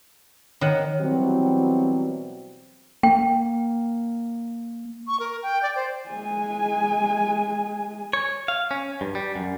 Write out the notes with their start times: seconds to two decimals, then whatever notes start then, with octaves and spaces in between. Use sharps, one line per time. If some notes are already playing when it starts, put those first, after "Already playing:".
0.61 D#3 C#5 F#5
1.01 B2 E3 F#3 G3 C4
3.03 A#3 G5
5.07 C#6
5.20 A#4
5.43 G5
5.63 D5
5.75 C5
6.08 G#3 G#5
8.13 C#5
8.48 F5
8.71 C#4
9.01 G2
9.15 G3
9.36 F#2